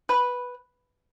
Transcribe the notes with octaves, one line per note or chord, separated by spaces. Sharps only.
B4